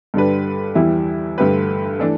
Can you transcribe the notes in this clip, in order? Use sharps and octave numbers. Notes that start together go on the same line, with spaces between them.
G2 D3 G3 D4 B4
E2 E3 G3 E4
G2 D3 A3 G4 B4
E3 A3 D4 A4